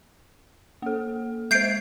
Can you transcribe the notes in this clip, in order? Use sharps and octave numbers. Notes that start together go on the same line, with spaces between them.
A#3 A4
G#3 C5 G6 C7 D7